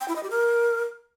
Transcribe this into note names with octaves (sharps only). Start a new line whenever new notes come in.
G5
E4
D#5
G4
A#4